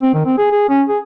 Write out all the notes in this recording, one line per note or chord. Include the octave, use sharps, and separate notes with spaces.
C4
D#3
C4
G#4
G#4
C#4
G#4